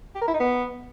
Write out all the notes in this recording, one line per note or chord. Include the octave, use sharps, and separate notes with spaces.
G4
A#4
E4
D#4
B3